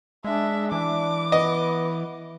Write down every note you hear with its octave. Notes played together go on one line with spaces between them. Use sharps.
G#3 D4 E5
E3 D4 D6
B3 D#5